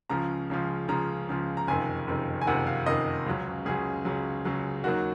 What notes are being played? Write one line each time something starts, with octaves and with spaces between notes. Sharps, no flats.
C#2 C#3 F3 A#5
C#2 C#3 F3
C#2 C#3 F3 A#5
C#2 C#3 F3
A#5
F#1 F2 C3 D#3 G#5
F#1 F2 C3 D#3
G#5
F#1 F2 C3 D#3 F#5
F5
F#1 F2 C3 D#3 D#5
C#2 C#3 F#3
C#2 C#3 F#3 G#4
C#2 C#3 F#3
C#2 C#3 F#3
D#2 D#3 F#3 F#4